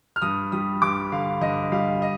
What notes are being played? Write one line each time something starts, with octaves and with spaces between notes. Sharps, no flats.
F6
G2 D#6
G3 D#6
G2 D6
D3 F5
G2 D#5
G3 F5
D#5